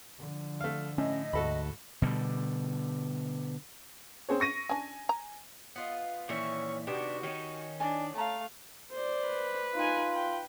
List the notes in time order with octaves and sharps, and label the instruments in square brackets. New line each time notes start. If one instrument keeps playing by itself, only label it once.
[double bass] D3 F3
[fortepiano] A3 F5
[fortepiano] A2 [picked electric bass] C#4 [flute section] D#5
[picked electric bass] D2 [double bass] G#2 [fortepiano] F#4 A4 B5
[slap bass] B2 D3 G3
[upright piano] C4 G#4 C#5
C#6 A#6 D#7
[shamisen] C#4 D4 [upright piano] G#5
[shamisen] A#5
[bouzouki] B3 F4 D#5
[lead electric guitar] A#2 E3 [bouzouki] D#3 C#4 E5 [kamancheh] C#6
[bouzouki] C3 D#3 B3 [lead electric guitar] D4 [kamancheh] F#4 [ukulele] G4
[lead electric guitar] D#3 D#4 [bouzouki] C#4 [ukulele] G4 C#5
[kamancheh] D4 [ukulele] E4 D5 G#5
[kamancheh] A3 F5 [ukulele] A5 A#5
[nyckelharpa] C5 D5
[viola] B4
[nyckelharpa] D#4 G#5 [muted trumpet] F4
[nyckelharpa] G5